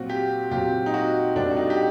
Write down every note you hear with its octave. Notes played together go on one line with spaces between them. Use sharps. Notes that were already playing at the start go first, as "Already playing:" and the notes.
Already playing: A#2 F#3 C4 F#4
G4
A#2 F#3 C4 G4
D#4
F#4
A2 G3 C4 D4
F#4
D#4
G4